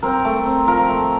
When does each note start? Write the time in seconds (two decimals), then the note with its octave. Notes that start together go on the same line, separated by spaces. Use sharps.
0.03 C4 A#4
0.25 A3
0.46 C4
0.67 F3 A#4
0.89 A3